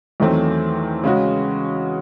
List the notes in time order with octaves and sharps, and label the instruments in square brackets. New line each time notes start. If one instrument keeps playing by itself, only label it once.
[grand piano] E2 D#3 F#3 A3 C4
C#3 G#3 C#4 F#4